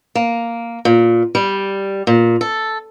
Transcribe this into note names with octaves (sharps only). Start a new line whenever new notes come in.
A#3
A#2
G3
A#2
A4